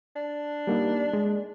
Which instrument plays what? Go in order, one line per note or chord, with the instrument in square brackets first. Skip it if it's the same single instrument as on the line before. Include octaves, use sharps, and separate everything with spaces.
[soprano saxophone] D4
[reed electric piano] G3 A#3 D#4
G#3